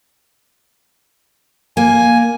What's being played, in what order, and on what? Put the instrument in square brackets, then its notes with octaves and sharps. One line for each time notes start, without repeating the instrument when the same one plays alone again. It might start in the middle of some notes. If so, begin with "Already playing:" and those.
[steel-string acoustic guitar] A#3 [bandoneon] G#5